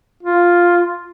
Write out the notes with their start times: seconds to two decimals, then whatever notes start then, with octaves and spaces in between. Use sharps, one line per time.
0.23 F4